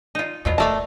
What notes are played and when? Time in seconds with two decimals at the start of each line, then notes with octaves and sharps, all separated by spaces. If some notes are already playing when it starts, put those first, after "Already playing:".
0.15 D#4 F4
0.45 E2 B2 F3 F#3 F4
0.58 D1 E3 A3 A#4 D5 F5 A5